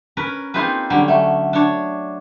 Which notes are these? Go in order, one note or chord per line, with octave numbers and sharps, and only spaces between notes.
C#4 A#4 B4
A#3 C4 D#4 F4 G#4 B4
D3 F#3 G3 C#4
A3
D4 C#5